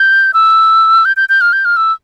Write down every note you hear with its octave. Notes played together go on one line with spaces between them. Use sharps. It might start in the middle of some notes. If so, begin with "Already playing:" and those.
Already playing: G6
E6
G6
G6
G6
F6
G6
F6
E6